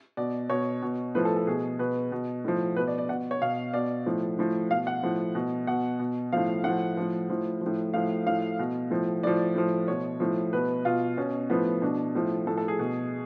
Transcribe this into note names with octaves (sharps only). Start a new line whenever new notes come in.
B2 D5
B2 C#5
B2
A2 F3 B4
A4
A4
B2 G#4
B2 B4
B2
A2 F3
B2 B4
D5
D5
B2 F#5
C#5
B2 F5
B2 D5
A2 F3
A2 F3
B2 F5
F#5
A2 F3
B2
B2 F#5
B2
A2 F3 F5
A2 F3 F#5
A2 F3
A2 F3
A2 F3
A2 F3 F5
A2 F3 F5
B2
A2 F3
A2 F3 D5
A2 F3
B2 C#5
A2 F3
B2 B4
B2 F4
B2 C#4
A2 F3 B3
B2 D4
A2 F3
A2 F3 A4
A4
G#4
B2